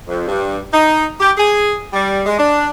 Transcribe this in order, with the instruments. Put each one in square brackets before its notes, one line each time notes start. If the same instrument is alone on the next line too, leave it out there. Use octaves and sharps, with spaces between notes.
[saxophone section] F2
G2
D#4
G4
G#4
G3
G#3
D4